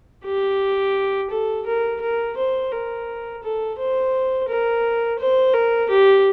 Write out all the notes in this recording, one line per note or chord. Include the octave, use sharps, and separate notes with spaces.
G4
A4
A#4
A#4
C5
A#4
A4
C5
A#4
C5
A#4
G4